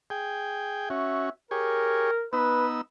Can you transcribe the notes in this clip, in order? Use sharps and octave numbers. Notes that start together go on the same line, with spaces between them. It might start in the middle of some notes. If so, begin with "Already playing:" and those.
G#4 G5
C#4 F#4 E5
G4 G#4 A#4 C#5
B3 D#4 B4 E6